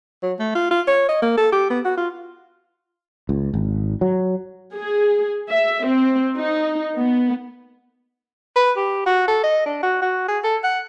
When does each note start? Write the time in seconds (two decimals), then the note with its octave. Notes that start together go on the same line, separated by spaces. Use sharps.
0.23 F#3
0.39 A3
0.55 F4
0.71 F4
0.88 C#5
1.09 D#5
1.22 A#3
1.37 A4
1.52 G4
1.70 B3
1.85 F#4
1.98 F4
3.29 C#2
3.54 G#1
4.01 F#3
4.75 G#4
5.49 E5
5.83 C4
6.37 D#4
6.96 B3
8.56 B4
8.77 G4
9.06 F#4
9.28 A4
9.44 D#5
9.66 D4
9.83 F#4
10.02 F#4
10.28 G#4
10.44 A4
10.64 F#5